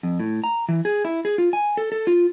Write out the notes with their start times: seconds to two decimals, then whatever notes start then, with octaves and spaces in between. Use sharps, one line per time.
0.03 F2
0.19 A2
0.44 A#5
0.69 E3
0.85 G#4
1.05 E4
1.25 G#4
1.38 F4
1.53 G#5
1.77 A4
1.92 A4
2.07 F4